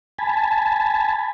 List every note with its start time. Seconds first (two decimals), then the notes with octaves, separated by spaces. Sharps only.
0.19 G#5 A5 B5